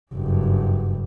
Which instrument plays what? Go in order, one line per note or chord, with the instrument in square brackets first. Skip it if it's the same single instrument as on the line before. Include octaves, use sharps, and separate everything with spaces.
[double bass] F#1 G2